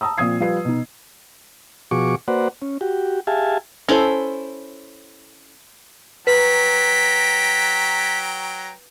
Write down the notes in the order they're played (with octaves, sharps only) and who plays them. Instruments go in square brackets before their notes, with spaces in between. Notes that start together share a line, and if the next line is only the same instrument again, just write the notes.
[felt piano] A5 A#5 D#6 E6
A#2 F3 C4 D#6 G#6 C7
F3 G3 B4 C7
B2 D#4
[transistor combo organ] B2 F3 F#4 G#4 C#6 D6
A#3 F#4 B4 C5 D5 F#5
C#4
F#4 G4
G4 G#4 E5 F5 G#5 A5
[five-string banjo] C#4 E4 A4 C5
[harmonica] F#3 G5 A#5 [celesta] B4 [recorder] B6